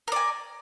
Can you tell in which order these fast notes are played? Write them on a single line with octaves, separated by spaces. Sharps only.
A#4 D5 G#5